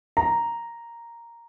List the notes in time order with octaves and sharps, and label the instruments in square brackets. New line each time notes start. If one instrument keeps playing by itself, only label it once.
[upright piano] A#5